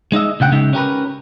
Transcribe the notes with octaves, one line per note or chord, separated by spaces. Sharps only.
G#3 D#4 D#5 E5
D2 C#3 F#5 G5
C#3 G#3 D#4 E5
C#4 G4 A#4 B4